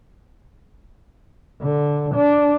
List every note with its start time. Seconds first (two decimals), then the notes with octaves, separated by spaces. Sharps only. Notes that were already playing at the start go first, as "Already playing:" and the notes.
1.61 D3
2.15 D4